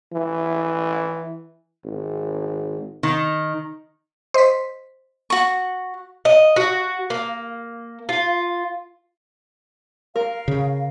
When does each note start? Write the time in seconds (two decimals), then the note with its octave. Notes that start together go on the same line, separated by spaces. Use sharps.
0.13 E3
1.85 G#1
3.03 D#3
4.34 C5 D#5 C6 B6
5.30 F#4 C#6
6.25 D#5
6.56 F#4
7.10 A#3
8.09 F4
10.16 A#4 F5
10.48 C#3